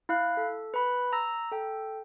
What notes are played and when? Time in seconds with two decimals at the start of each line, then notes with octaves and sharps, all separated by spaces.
0.09 E4 F5 F#6
0.37 A4
0.74 B4 B5
1.13 A#5 E6 A#6
1.52 A4 G5